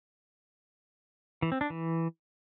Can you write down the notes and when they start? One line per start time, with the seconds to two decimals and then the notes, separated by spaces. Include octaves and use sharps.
1.42 E3
1.52 C4
1.61 D4
1.70 E3